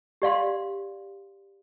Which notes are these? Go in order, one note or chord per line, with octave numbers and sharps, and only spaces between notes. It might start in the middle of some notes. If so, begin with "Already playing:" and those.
G4 D5 F5 C6